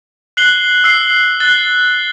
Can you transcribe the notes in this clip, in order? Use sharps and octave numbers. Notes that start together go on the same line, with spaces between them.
F#6 C7 F#7 G7
E6 C7
F#6 A6 G7